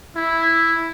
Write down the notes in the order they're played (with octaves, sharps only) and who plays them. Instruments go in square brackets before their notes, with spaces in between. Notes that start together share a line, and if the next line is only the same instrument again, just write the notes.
[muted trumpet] E4